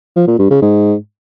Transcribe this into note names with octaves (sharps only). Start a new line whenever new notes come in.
F3
A#2
G2
C#3
G#2